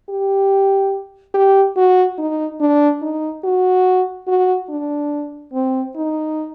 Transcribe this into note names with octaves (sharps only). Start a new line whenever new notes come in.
G4
G4
F#4
D#4
D4
D#4
F#4
F#4
D4
C4
D#4